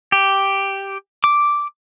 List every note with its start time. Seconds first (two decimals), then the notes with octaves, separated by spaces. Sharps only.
0.12 G4
1.24 D6